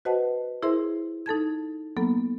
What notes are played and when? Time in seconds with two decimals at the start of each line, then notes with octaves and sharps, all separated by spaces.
0.05 F#4 B4 C5 D#5 F#5 A5
0.62 E4 G#4 A#4 C5 E5 C6
1.26 D#4 A4 A5 G#6
1.97 F#3 A#3 B3 A4